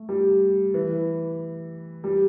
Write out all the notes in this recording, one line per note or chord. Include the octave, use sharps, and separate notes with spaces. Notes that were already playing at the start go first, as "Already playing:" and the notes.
Already playing: A3
G3
E3
G3